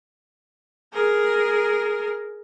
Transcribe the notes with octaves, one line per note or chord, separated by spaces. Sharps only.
G#4 A#4